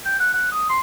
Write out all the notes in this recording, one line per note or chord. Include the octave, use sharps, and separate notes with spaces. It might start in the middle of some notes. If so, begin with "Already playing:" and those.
G5
F#5
F#5
D#6
C6